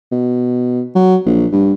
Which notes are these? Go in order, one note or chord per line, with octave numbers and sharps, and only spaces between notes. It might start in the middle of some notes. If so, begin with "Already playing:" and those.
B2
F#3
A#1
G2